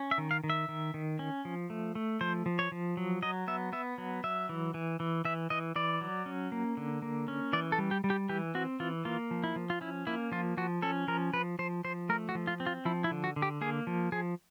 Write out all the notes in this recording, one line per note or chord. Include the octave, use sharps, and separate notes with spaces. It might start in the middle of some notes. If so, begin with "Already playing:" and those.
Already playing: C#4
E5
D#3
F5
D#3
E5
D#3
D#3
C#4
F3
A3
A3
F3 C5
F3
C#5
F3
F#3
F#3 D#5
B3 E5
B3 E5
F#3
F#3 E5
E3
E3
E3
E3 E5
E3 D#5
E3 D5
F#3
C#4
A#3
D3
A#3
C#4
E3 D5
A4
G3
G4
G3
G4
E3 G4
C4 F#4
E3 F4
A#3 F4
F3
E4
F3
F4
C#4 E4
A#3 E4
F3 F4
F3 F#4
C#4 A4
F3 A#4
F3 B4
F3 C5
F3 C5
A3 A#4
F#4
F3
F4
C4
F4
F3 E4
E4
D3
F#4
D3
G4
A#3 G#4
F3
F3 G#4